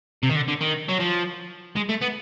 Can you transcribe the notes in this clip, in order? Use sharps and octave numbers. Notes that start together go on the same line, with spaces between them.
C3
D#3
D3
D3
D#3
F#3
F3
G#3
A3
B3